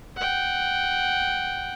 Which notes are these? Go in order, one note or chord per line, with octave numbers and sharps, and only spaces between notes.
F#5 G5